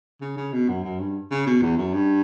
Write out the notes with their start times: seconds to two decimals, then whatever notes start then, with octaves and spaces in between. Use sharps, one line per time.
0.21 C#3
0.36 C#3
0.52 B2
0.68 F#2
0.84 F#2
1.00 G2
1.31 C#3
1.47 B2
1.62 E2
1.78 F#2
1.93 G2